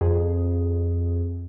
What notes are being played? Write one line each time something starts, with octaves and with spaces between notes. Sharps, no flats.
F2 G#4